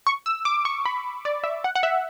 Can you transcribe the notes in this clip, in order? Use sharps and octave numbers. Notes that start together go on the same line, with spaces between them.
C#6
E6
D6
C#6
B5
D5
E5
F#5
F#5
E5